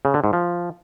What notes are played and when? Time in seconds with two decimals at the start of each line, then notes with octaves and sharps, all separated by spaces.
0.05 C#3
0.14 D3
0.24 G#2
0.33 F3